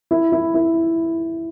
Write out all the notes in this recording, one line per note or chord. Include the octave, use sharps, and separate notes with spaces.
E4
E4
E4